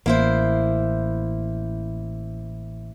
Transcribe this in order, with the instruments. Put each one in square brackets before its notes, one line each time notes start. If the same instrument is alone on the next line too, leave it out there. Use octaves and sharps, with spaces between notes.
[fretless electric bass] A1 [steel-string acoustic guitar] A#3 E4 C5